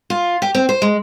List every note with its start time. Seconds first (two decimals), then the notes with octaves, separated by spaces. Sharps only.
0.10 F4
0.42 G4
0.54 C4
0.69 C5
0.82 G#3